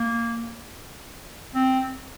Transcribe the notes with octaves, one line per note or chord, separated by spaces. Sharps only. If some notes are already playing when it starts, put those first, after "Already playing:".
Already playing: A#3
C4